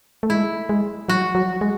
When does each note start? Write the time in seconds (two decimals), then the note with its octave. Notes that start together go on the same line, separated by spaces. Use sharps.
0.23 A3
0.30 G#3 E4
0.69 G#3
1.09 F#3 F#4
1.35 F#3
1.61 G#3